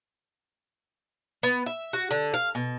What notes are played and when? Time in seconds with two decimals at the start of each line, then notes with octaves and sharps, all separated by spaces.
1.43 B3
1.66 E5
1.93 F#4
2.11 D3
2.34 F5
2.55 B2